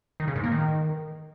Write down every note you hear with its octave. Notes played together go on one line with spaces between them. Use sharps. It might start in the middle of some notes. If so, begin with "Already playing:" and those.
D#3
C#3
G#2
A#3
D#3